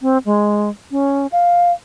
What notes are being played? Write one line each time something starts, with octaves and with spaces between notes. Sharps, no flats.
C4
G#3
C#4
F5